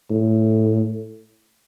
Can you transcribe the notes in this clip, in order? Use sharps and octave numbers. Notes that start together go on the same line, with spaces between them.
A2